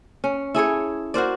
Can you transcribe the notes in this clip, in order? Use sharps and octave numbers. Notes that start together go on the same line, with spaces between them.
C#4
E4 G#4 A4 C#5
F#4 A#4 C5 D5